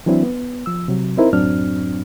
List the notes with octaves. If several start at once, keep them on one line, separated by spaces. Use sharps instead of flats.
E3 F#3 C4 D4 E4
B3
F3 E6
C3 F#3
C4 D#4 E4 A#4 C5
F#2 A2 F#3 C4 D4 F6